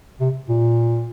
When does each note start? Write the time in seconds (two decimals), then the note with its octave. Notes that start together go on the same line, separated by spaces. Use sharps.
0.20 C3
0.49 A#2